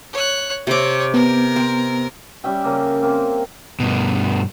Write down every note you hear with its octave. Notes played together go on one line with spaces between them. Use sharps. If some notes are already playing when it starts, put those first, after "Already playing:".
C#5 F#6
C3 C4 C#5 D6
B3 A#4
C4
G3 C#4 E5 G5
C#3 A#3
A#3 C4
G2 B2